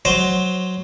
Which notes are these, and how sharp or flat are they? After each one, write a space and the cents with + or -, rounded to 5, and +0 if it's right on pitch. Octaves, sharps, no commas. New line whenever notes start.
F#3 +0 C5 +0